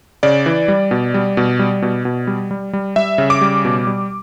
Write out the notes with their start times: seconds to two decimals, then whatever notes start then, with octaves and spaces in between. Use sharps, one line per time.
0.23 C#3 D5
0.46 E3
0.68 G3
0.91 B2
1.14 G3
1.37 B2
1.59 G3
1.82 B2
2.05 B2
2.27 G3
2.51 G3
2.73 G3
2.96 G3 E5
3.18 C#3
3.30 D6
3.41 G3
3.65 B2
3.87 G3